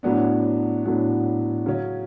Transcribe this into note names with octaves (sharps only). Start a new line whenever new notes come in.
A2 F#3 B3 D4
A2 F#3 B3 D4
C#3 F#3 C#4